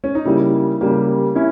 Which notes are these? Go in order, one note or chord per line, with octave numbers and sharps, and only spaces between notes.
C#4
D#4
C#3 G3 A#3 E4
C#3 G3 A#3 G4
C#4 E4